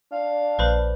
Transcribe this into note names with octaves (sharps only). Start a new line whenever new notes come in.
D4 F5
A#1 B4 C5 B5